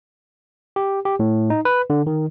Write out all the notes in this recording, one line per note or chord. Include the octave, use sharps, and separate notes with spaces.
G4
G4
A2
D#4
B4
D3
D#3